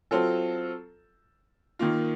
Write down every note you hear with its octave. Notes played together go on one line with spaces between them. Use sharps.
F#3 C4 F4 A4
D#3 A#3 F4